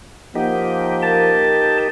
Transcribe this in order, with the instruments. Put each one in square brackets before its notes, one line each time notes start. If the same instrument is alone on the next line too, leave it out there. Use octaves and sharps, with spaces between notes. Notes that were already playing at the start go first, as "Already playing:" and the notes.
[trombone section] F3 A#3 [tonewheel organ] D#4 G4 [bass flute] F#5
[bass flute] A#4 [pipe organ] A5